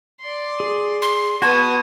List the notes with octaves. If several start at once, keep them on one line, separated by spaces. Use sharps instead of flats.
D5 C6
G#4
C6
B3 F#4 A5 C#6 D#6 G#6